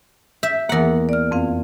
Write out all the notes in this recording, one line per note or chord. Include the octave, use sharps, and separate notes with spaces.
E5 G6
E2 A#3 A#4 F#5
D5 F6
F2 C4 F5